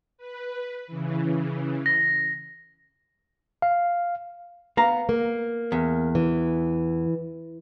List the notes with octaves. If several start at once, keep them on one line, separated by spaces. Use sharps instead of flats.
B4
C#3 E3
A#6
F5
B3 F5 A#5
A#3
E2
E3